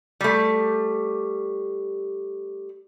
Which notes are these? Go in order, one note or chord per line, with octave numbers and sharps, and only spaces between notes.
G3 A3